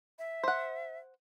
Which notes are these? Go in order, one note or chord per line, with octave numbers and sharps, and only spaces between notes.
E5
C5 F#5